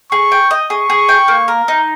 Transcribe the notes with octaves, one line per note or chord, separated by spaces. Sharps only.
G#4 C#6
G5
D#5
G#4 C#6
G#4
G5
A#3
A#4
D#4